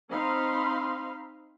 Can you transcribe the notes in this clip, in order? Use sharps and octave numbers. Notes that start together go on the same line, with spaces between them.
C4 D#4 F5 B5 C6